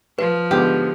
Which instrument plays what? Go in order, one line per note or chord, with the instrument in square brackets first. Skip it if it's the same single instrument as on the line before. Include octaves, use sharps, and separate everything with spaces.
[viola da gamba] F3 [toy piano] B4
[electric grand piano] G#2 D3 B3 [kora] G4